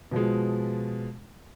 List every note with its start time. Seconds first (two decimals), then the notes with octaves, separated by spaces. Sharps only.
0.11 B2 F3 G#3